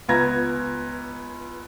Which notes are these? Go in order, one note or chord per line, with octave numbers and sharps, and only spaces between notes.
C#2 B3 F4 A#5 G#6 A#6